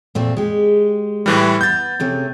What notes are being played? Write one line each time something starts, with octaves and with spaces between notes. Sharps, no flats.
A#2 A3 C4
G#3 G4
A2 E3 G3
B3 G6 A6
C3 A3 C#4